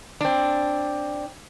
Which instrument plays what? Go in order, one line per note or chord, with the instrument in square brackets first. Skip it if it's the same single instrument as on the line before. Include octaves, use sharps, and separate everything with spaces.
[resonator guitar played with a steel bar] C4 D4